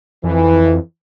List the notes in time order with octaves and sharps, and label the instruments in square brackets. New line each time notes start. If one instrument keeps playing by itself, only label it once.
[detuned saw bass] F2 [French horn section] E3